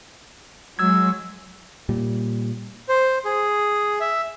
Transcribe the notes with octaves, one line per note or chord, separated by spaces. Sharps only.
F#3 G#3 E6 G#6
A#2 G3
C5
G#4
E5